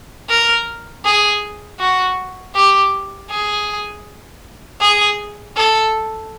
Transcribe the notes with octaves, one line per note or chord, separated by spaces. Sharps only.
A#4
G#4
F#4
G4
G#4
G#4
A4